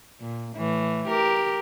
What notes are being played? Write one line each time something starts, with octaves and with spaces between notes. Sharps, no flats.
A#2
A2 E3
G4 A#4